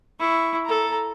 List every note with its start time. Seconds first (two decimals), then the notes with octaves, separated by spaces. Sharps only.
0.20 E4 C#6
0.65 A4 A#5